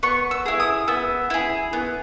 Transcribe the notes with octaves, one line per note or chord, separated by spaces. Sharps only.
B3 C#6
E6
E4 G#4
D#6
B3 E6
E4 G#4
B3